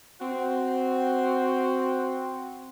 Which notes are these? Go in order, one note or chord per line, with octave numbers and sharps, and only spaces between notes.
C4 F#4 C5